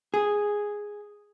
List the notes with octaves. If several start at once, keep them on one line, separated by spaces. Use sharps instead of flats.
G#4